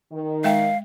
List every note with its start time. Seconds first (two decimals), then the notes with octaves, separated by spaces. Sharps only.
0.11 D#3
0.44 G#3 E5 F5 G5